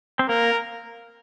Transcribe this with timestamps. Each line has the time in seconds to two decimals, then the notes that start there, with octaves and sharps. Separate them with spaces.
0.19 C4
0.29 A#3 A#4